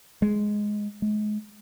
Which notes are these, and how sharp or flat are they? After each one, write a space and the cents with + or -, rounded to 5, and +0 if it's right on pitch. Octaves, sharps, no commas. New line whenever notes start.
G#3 +5
G#3 +30